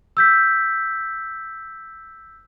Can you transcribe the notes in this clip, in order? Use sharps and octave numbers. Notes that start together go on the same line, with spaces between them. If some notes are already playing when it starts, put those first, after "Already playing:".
E6 G6 B6